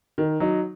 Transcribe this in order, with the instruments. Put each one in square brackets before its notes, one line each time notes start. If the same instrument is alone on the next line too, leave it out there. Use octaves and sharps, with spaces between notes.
[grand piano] D#3
F#3 D#4